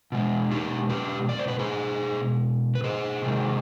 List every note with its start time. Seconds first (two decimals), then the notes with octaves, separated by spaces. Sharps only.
0.12 B2 G#3
0.51 D#4 G4
0.90 G4 B4
1.29 D5
1.39 C5
1.48 B4
1.59 G#4 C5
2.75 B4
2.84 G#4 C5
3.22 C3 D#3 G#3